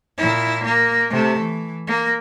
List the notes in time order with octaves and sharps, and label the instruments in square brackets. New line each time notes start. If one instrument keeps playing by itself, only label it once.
[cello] A#2 E4
A#3
C3 A3
E3
A#3